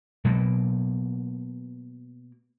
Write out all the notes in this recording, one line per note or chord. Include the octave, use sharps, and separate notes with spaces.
B2 F#3 A#3